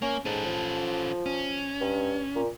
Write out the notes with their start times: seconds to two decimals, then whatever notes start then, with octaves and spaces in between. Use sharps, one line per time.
0.02 A#3 C#4
0.25 G#2 C#4 A4
0.45 F3
1.26 C#4
1.81 G2
2.35 A#2